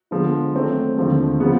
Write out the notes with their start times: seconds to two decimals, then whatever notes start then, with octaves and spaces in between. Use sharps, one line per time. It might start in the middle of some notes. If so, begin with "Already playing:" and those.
0.11 D3 F3 G#3 B3
0.54 D#3 F#3 A3 C4
0.97 D#2 D3 F3 G#3 C4
1.40 C#3 F3 G#3 B3